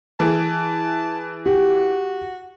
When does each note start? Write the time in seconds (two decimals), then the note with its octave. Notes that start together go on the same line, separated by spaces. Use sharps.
0.20 E3 G#4 A5
1.46 F#4 G4